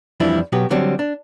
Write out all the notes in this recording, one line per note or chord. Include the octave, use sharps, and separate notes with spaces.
F2 E3 F3 G3 D4 E4
B2 F#3 B3 F#4 G4
D3 F#3 G3 C4
D4